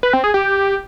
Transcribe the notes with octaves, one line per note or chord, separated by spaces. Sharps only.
B4
C4
G#4
G4